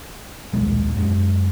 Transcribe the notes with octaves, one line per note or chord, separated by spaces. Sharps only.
D#1 B1 G#3
F#2 G#3